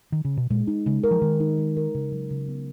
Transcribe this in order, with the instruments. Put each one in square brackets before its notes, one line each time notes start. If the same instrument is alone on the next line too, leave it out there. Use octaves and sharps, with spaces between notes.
[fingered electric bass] D#3
C#3
B2
[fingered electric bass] A#2 [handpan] G#3
[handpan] D#4
[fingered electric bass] C#3 [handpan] G#3
[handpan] A#4
[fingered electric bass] F3
[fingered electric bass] D#3 [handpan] G#3
[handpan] D#4
G#3
A#4
C#3
F#3
C#3
B3